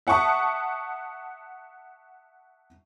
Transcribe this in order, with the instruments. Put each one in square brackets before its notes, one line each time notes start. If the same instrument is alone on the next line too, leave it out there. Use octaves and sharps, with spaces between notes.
[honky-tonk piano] E5 F#5 A5 C#6 D#6